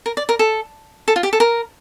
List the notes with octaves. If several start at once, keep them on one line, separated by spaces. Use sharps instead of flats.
A#4
D5
A#4
A4
A4
F4
G4
A4
A#4